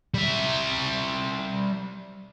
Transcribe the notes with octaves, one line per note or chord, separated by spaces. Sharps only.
G3 E5